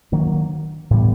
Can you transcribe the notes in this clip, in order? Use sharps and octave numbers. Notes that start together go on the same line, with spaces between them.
D#3 F#3 A#3 D4
A2 E3 G3 B3